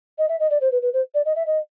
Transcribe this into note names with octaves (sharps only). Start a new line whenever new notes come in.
D#5
E5
D#5
D5
C5
B4
B4
C5
D5
D#5
E5
D#5